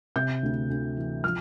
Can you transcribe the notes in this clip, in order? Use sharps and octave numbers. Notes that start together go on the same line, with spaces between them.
C3 G6
D2
D2
E3
F3 F6